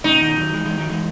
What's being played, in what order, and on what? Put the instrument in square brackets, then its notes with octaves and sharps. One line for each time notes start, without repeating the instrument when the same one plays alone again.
[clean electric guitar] A2 C#3 [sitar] D#4
[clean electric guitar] B2 D#3
D#3 F#3
E3 G#3
E3 G#3
D#3 F#3
E3 G#3